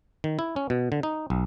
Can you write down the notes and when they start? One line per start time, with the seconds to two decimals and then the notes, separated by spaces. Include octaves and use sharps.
0.24 D#3
0.39 E4
0.56 C#4
0.70 B2
0.92 D3
1.03 D#4
1.30 B1